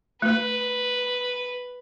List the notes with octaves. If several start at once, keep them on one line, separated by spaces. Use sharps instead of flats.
A3 B4